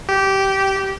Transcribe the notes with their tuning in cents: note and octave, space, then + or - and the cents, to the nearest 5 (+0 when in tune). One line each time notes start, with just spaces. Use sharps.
G4 -15